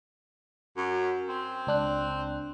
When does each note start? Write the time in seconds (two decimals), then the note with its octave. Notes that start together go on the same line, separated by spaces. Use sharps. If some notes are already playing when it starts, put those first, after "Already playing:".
0.77 F#2
1.28 C4
1.67 C#2 D4 F#6